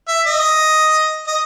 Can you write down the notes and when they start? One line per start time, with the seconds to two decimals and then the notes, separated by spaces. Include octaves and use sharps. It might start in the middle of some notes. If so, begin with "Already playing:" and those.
0.08 E5
0.26 D#5
1.27 D#5